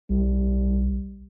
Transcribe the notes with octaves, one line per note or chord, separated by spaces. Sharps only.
B1 G3